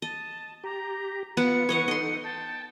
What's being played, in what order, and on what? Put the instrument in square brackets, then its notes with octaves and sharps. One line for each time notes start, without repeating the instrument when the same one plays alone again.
[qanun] D#5 [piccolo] A5
[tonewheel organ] G4 [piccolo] A#5
[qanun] B3 B4 F#5 [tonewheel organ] F4 [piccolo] C#7
[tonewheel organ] E3 B3 B4 [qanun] C#5 D#5 F#5
[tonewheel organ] D#4 A4 F#5 [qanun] D#5 C6
[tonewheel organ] G5 [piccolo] A5